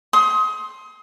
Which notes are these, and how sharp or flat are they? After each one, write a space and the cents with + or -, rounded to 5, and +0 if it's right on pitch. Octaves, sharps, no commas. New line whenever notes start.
C6 +10 D#6 +30